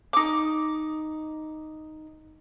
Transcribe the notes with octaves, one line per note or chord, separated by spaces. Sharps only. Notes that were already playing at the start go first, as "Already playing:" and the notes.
D#4 D6